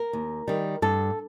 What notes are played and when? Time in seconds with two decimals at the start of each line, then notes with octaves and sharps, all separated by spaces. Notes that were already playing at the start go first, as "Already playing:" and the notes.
Already playing: A#4
0.13 D#2
0.48 D#3 G3
0.82 G2 A4